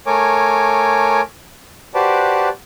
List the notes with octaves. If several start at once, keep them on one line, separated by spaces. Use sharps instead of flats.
A3 A#4 C#5 G#5 D6
F#4 G4 B4 C5 D5 A5